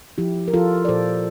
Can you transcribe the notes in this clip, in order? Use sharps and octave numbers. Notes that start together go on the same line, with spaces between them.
F3 E4 G4
A#4
F3 F4 A4
D5
A#2 A4 C5